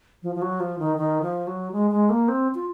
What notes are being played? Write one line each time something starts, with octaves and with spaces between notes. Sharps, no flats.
F3
F3
F#3
F3
D#3
D#3
F3
F#3
G#3
G#3
A#3
C4
F4